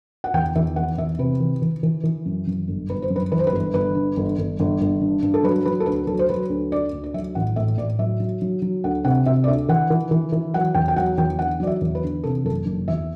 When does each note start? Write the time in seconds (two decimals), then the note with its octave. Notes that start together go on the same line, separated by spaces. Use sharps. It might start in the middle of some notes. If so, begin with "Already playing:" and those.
0.24 F#5
0.34 E2 G5
0.55 E2 E5
0.76 E3 F#5
0.98 E2 E5
1.19 C3 B4
1.40 E3
1.62 E3
1.83 E3
2.04 E3
2.26 F#2
2.47 F#2
2.68 G1
2.89 G1 B4
3.02 C5
3.10 F#2
3.16 B4
3.32 E3 B4
3.39 C5
3.47 B4
3.52 G1
3.74 G1 B4
3.95 D3
4.17 G1
4.38 G1
4.60 G1
4.81 G1
5.01 G2
5.22 G2
5.34 A4
5.43 F#3 B4
5.66 F#3 B4
5.80 A4
5.86 D2 B4
6.07 F#3 A4
6.19 C5
6.30 F#3 B4
6.50 D2
6.72 D3 D5
6.92 D2
7.04 D5
7.14 F#3 E5
7.35 A1 F#5
7.56 A2 E5
7.78 A2 D5
7.99 F#3 E5
8.20 F#3
8.42 F#3
8.62 F#3
8.84 D2 F#5
9.05 C3 F#5
9.26 C3 E5
9.44 D5
9.47 D2 E5
9.69 E3 F#5
9.90 E3
10.11 E3
10.32 E3
10.54 F#3 F#5
10.75 E2 G5
10.88 G5
10.96 F#3 F#5
11.17 E2 G5
11.39 D3 F#5
11.60 F#3 D5
11.67 E5
11.81 E2
11.95 B4
12.03 D3
12.24 C3 A4
12.45 F#1 A4
12.66 F#1
12.88 E2 E5